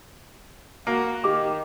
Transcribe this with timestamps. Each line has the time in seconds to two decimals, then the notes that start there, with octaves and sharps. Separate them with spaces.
0.87 A#3 F#4
1.24 D#3 G4 D6